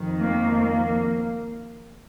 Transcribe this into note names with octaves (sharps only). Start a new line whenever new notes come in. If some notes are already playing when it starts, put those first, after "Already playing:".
Already playing: F2 D#3
A#3
A#3